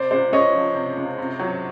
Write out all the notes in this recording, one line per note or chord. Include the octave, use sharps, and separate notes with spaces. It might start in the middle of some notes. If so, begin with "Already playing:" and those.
Already playing: C3 C5 D5
C#2 C5 D5
C#2 C#5 D#5
F3
C3
C#2
C3
F#3